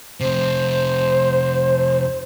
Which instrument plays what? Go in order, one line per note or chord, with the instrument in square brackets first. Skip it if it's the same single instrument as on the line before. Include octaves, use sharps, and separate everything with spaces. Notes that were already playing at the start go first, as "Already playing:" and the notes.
[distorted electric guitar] F2 C3 [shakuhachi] C5